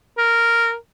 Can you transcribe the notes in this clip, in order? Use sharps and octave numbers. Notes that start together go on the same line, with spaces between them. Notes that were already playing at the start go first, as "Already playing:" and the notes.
A#4